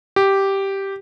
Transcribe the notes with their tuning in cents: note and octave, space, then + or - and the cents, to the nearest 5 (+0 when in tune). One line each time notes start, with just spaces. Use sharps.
G4 -5